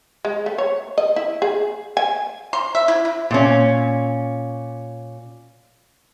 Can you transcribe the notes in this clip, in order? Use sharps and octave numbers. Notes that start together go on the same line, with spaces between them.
G#3
A3
C#5
D#5
E4
G#4
G#5
C6
E5
E4
E4
A#2 C#4